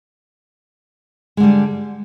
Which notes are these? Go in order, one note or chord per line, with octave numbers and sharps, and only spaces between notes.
D3 G3 G#3